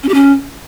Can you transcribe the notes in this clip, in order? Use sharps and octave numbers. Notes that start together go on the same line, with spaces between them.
C#4
G4
C#4